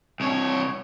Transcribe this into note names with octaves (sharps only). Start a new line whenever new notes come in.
C2 C#5